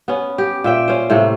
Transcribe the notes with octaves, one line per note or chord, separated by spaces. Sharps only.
B3 C#4
G4
A#2 E5 G5
C#4 C5
A2 C3 A3 A#3